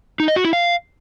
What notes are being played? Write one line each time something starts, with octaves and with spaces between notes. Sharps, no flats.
D#4
D#5
F#4
E4
F5